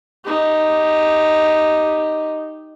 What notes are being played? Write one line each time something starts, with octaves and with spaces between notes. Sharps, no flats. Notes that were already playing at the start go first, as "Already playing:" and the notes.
D#4 G4